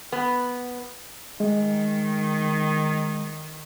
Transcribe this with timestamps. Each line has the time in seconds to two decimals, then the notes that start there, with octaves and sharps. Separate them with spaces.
0.12 B3
1.40 D#3 G#3